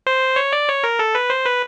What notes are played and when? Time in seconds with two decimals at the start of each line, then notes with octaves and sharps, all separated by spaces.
0.07 C5
0.36 C#5
0.53 D5
0.68 C#5
0.84 A#4
0.99 A4
1.15 B4
1.30 C5
1.46 B4